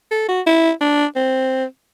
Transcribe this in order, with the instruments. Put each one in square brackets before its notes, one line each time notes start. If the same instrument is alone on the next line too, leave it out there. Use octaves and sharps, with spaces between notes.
[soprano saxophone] A4
F#4
E4
D4
C4